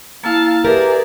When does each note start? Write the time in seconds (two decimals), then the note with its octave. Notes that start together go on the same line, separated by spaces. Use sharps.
0.24 A#3 E4 F5 A5
0.65 G4 G#4 A#4 B4 D5 E5